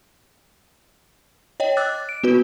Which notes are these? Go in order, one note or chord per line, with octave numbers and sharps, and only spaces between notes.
C#5 D#5 G5
D6 E6 F#6 A6
D7
B3 F#4 B4